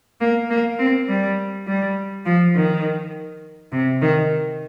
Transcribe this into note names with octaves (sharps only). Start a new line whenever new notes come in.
A#3
A#3
C4
G3
G3
F3
D#3
C3
D#3